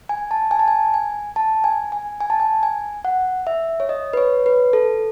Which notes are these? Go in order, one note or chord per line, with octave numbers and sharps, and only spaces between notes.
G#5
A5
G#5
A5
G#5
G#5
A5
G#5
G#5
G#5
A5
G#5
G#5
F#5
E5
C#5
D#5
B4
C#5
B4
A4